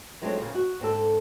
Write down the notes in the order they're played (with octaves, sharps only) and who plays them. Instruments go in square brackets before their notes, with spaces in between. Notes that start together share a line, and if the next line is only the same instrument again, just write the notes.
[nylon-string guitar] F3 F#3 G#3 A3 C4 D4
A#2 C#3 F3 F4
F#4
G#2 C4 D4 A4